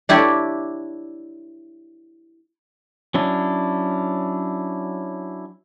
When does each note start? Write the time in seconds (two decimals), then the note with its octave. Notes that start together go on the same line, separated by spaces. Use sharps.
0.09 D4 E4 G4 C#5 D5
3.14 F#3 C#4 D4 E4